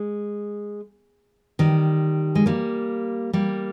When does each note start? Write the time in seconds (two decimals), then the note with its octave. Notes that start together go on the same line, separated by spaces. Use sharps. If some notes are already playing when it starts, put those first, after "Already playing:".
Already playing: G#3
1.59 D#3 G3
2.35 G#3
2.46 G3 A#3
3.33 G3 A#3